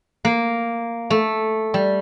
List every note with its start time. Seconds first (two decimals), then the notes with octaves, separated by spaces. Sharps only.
0.25 A#3
1.10 A3
1.74 G3